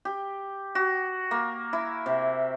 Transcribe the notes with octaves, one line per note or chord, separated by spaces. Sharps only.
G4
F#4
A#3
E4
C3